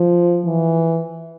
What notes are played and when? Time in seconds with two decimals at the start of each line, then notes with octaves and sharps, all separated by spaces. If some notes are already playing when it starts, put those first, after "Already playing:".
Already playing: F3
0.46 E3